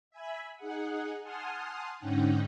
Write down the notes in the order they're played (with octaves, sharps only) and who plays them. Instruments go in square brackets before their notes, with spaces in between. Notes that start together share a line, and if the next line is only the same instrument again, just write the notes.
[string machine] E5 G#5 B5
D#4 G#4 F#5
F#5 G#5 A5 C6 D#6 F6
G#2 D3 C#4 D#4 F#5 G5